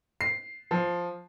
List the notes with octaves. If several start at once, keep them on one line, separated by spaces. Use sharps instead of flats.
C7
F3